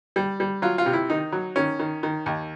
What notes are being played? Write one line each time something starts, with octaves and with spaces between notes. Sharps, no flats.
G3
G3
F#3 F4
F4
C3
E4
D#3 D#4
F#3
D#3 C#4
D#3
D#3
D#2